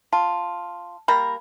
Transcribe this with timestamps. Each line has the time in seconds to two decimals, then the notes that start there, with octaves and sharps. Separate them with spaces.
0.13 F4 A5
1.08 G3 A#3 A#4 B5